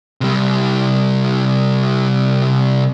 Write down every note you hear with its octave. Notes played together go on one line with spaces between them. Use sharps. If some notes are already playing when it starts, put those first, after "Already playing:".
C3 G3